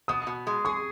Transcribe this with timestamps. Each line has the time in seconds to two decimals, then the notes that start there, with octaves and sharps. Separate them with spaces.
0.08 B2 D#6
0.27 B2
0.47 G#3
0.65 G#4 C#6